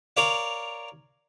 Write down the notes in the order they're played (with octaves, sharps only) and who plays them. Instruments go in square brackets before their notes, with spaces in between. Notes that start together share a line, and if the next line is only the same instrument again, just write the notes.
[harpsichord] A#4 C#5 D5 F5